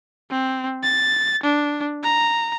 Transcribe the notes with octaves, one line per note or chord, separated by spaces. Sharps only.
C4
A6
D4
A#5